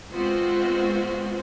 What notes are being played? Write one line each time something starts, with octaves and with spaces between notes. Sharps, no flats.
G#3 B3 C4 F4 F#4 C5